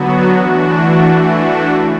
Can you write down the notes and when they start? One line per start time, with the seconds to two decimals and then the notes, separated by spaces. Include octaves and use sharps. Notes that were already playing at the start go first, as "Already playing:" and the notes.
Already playing: D3 F#3 B3 F#4
0.30 E3 A3 D4 F#4
1.00 E3 A3 D4 F#4
1.70 C#3